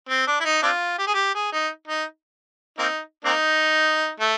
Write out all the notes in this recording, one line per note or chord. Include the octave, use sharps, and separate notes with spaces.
C4
D4
E4
D#4
C4 D4 F4
G4
G#4
G4
G#4
D#4
D#4
A#3 C4 D#4
A#3 C4 D#4
A3